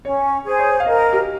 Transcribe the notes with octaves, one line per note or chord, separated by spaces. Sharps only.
C#4 C#5
G#4 C5
C#5
F5
A#4 D#5
G4